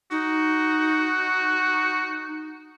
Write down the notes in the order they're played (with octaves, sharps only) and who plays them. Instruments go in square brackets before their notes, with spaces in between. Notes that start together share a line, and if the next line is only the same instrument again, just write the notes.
[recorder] D#4 [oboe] F#4